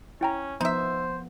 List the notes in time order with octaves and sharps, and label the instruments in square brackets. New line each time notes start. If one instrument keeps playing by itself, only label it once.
[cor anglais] C#4 [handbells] E4 G5 A#5
[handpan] F3 B3 [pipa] D#4 E5 [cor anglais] C5